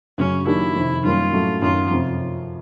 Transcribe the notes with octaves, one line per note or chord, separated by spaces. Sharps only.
F#2 C#3 F#3 C#4
D#3 F#3 A#3 D4 E4 G4
F2 C3 D#3
F#2 D#3 G3 A#3 C#4 F4
A2 F#3 A3 C#4 E4
F#2 D#3 F#3 F4
F2 C3 F3